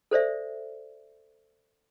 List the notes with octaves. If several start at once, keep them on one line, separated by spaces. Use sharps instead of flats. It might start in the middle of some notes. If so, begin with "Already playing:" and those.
A4 C5 D5 E5